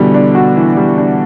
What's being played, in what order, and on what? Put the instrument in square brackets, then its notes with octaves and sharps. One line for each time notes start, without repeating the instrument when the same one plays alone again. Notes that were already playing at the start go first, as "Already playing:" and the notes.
Already playing: [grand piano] B2 D3 [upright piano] E3 G3
[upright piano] D4
F#4
E3
G3
D4